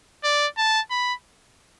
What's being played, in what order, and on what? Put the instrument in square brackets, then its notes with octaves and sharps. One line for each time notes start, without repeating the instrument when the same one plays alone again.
[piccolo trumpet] D5
A5
B5